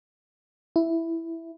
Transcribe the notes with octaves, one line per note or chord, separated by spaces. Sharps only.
E4